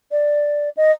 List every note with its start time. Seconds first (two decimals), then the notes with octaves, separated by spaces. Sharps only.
0.11 D5
0.77 D#5